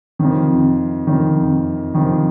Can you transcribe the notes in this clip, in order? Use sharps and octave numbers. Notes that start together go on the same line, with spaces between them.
F2 C3 D#3
F2 C3 D#3
F2 C3 D#3